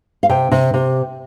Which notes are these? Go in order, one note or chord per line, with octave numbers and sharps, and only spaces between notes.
F5
C3 G5
C3
C3